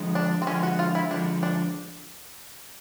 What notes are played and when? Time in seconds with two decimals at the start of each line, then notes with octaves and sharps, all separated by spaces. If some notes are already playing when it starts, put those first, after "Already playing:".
Already playing: D3 F3 G#3
0.15 D4
0.42 C4
0.47 D3 F3 G#3 C#4
0.63 F#4
0.79 F4
0.95 E4
1.11 D3 F3 G#3 D4
1.43 D4